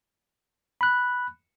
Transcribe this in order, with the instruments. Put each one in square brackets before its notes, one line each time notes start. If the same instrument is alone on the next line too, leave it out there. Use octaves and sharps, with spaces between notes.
[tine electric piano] B5 F#6